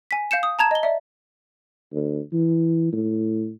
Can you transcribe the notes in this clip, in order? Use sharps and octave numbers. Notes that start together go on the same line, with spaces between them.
G#5 B6
F5 G6 C#7 E7
D#6
A5 A#5 G#6 E7
D#5 G7
D5 E5
D2
E3
A2